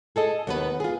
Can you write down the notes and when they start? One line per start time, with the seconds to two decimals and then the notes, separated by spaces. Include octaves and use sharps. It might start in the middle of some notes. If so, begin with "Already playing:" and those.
0.16 G#4 A4 D#5
0.47 D#2 B3 B4
0.80 F4 G#4